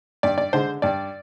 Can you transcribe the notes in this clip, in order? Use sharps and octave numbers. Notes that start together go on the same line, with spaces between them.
G2 D5
D5
D3 G#3 C5
G2 D5